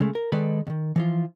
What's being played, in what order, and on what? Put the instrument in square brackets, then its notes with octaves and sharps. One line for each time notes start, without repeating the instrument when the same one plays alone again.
[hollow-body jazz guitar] C#3 G#3 A3
A#4
D#3 G#3 A4 B4 D5 B5
D#2 D#3
E3 F3 F4